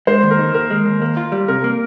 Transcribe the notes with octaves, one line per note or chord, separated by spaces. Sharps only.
G#3 C5
D#2
A#4
D#3
D#2 A#4
G#3
D#2
A#3
F4
G3
C3 A#4
A#3